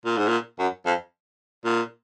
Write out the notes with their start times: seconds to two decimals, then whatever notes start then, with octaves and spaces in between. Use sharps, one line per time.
0.05 A#2
0.17 G#2
0.28 A#2
0.59 F#2
0.86 F2
1.65 A#2